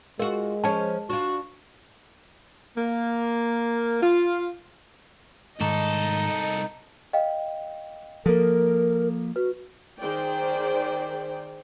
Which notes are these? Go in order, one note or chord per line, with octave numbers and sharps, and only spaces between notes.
G#3 F4 F#4 A#4
F3 C#4 C#5 A5
D4 F4 F#4
A#3
F4
C2 G#2 D#3 D#4 A4 D#5
D#5 F5 G5
F3 A#3 A4 A#4
F#4 B4
D#3 G#4 C5 D5 G5